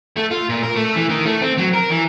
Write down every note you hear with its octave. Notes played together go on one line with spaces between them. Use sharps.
A3
F4
A#2
A#4
A3
E3
D#3
A3
C4
F#3
A#4
E3